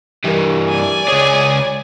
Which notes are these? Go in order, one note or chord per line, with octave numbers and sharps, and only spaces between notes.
G2 E3 G4 A#4
D5 G#5
C#2 G#4 C#5